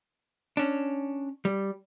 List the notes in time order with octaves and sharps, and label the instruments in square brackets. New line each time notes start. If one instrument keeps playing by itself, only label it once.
[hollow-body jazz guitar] C#4 D4
G3